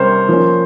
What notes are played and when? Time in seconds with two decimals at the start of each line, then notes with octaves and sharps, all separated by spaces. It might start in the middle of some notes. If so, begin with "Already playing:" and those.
Already playing: C3 G3 C#4 A#4 C5 C#5
0.29 F3 A#3 C#4